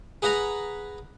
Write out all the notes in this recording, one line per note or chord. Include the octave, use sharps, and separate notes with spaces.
G#4 B4 F#5 A#5 B5